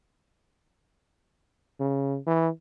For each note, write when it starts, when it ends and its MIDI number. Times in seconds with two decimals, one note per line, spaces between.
1.80 2.17 49
2.27 2.49 52